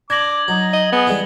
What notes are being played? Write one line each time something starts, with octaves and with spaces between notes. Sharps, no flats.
D4 D6 G#6 A#6 F#7
F#3 D#4
D#5
B3 G#4 G7
E3 G3 G#3